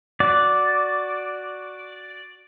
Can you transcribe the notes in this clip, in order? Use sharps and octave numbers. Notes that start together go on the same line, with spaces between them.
F#4 D5